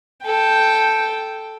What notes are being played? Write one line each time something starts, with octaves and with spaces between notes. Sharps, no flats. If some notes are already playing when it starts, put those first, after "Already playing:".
A4 G5